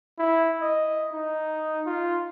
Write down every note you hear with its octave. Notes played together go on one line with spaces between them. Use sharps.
E4
D#5
D#4
F4